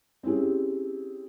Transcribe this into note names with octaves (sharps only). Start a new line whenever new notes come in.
C4 C#4 E4 G4 G#4